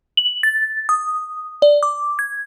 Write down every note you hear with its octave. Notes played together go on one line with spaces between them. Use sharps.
F#7
A6
D#6
D5
D6
G#6